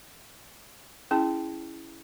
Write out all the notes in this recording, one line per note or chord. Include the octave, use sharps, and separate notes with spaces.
C#4 E4 G#4 A5